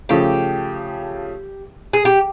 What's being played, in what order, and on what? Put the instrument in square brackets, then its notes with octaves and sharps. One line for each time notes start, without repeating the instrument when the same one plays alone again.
[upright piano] C#3 F3 A3 [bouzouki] G4
[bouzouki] G#4
G4